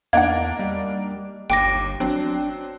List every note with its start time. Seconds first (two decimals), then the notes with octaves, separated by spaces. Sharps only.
0.13 E2 A#3 D4 D#4 F5 F#5 G#6
0.59 G3
1.50 G1 D#2 G5 D6 A#6
2.00 F#3 C4 D4